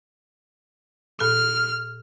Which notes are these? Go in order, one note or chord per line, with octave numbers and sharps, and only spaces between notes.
A#2 A4 F6